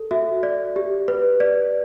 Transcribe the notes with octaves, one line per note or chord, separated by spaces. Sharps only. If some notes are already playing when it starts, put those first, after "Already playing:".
Already playing: A4
F#4 E5
D5
G4
B4
D5